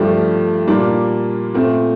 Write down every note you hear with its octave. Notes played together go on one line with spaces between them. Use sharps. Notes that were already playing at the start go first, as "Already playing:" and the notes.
Already playing: G2 F3 A3 D4 G4
A#2 G3 A#3 D4
A#2 A3 C4